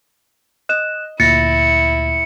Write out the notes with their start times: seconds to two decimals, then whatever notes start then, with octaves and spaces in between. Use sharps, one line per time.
0.69 D#5 F#6 E7
1.20 D2 A#2 E4 A6 A#6 C#7